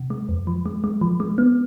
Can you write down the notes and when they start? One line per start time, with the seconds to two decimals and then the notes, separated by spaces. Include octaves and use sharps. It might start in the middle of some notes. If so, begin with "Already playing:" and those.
Already playing: C3
0.10 G#3
0.29 F2
0.47 F3
0.66 G#3
0.84 G#3
1.01 F3
1.20 G#3
1.38 B3